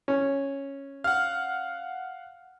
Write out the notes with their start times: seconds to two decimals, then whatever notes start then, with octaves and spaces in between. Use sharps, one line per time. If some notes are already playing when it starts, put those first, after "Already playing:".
0.08 C#4
1.04 F5 F#5 F6